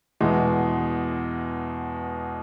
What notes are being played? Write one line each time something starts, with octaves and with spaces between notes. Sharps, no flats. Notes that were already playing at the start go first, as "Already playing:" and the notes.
E2 B2 G#3